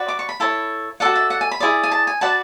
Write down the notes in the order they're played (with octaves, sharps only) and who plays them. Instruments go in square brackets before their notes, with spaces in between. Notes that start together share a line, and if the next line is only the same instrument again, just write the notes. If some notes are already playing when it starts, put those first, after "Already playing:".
Already playing: [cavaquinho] F#4 B4 D5
D6
C#6
B5
E4 A4 C#5
F#4 A4 D5 F#5
E5
F#5
G#5
B5
E4 G#4 D5
G#5
A5
G#5
F#4 B4 D5 A5